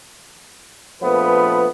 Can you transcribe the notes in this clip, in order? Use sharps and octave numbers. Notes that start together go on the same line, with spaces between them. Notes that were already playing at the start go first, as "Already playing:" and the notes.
A#1 F3 A3 B3 B4